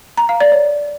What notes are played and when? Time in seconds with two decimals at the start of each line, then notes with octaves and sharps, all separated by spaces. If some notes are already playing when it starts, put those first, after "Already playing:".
0.18 A#5
0.29 F5
0.40 D5
0.52 C#5